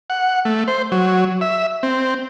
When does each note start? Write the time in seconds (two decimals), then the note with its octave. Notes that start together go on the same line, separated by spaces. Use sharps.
0.10 F#5
0.45 A3
0.68 C5
0.92 F#3
1.41 E5
1.83 C4